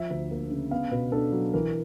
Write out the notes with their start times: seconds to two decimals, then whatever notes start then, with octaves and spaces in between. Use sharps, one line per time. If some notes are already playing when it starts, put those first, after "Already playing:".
Already playing: F3 E5
0.10 D2
0.31 A#3
0.50 C#3
0.71 B3 F5
0.91 B2 B4
1.12 D4 A4
1.32 F#3
1.53 E3 A#4